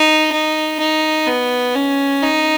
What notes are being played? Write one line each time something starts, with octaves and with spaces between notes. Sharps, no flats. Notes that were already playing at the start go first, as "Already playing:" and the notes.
Already playing: D#4
D#4
D#4
B3
C#4
D#4